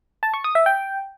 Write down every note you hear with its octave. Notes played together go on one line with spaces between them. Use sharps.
A5
C#6
D#6
E5
G5